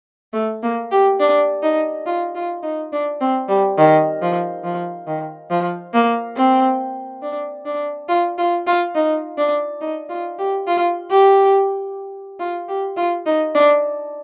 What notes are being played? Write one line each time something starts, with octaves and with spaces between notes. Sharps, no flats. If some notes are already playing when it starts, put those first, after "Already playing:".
A3
A#3
G4
D4
D#4
F4
F4
D#4
D4
C4
G3
D#3
F3
F3
D#3
F3
A#3
C4
D4
D4
F4
F4
F4
D#4
D4
D#4
F4
G4
F4
G4
F4
G4
F4
D#4
D4